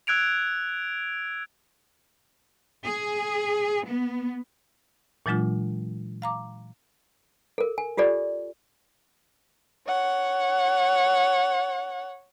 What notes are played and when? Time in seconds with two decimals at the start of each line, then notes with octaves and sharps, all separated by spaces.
0.07 E6 F#6 G#6 D7 F7
2.85 G#4
3.85 B3
5.26 A#2 E3 F#3 G#3 D4 F4
6.22 F5 A#5 D6
7.58 A4 A#4
7.78 G#5
7.97 F4 G4 A4 D5
9.87 C#5 F#5